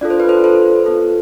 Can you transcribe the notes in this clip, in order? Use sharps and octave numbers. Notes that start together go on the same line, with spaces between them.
D4 F4 A4 D5
C5
B4
A4 C5
A4 C5
B3 F4 A4